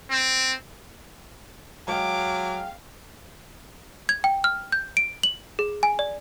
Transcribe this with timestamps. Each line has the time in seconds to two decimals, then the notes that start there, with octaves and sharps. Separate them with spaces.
0.11 C4
1.88 F#3 G#3 F5 G5 D6
4.09 G#6
4.24 G5
4.44 F6
4.72 G6
4.97 D7
5.23 F#7
5.59 G#4
5.83 G#5
5.99 D5